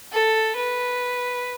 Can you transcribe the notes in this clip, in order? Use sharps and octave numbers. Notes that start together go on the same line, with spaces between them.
A4
B4